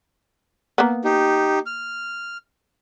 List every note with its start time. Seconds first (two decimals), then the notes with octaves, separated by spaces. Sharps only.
0.78 A#3 B3
1.05 D#4 G4
1.66 F6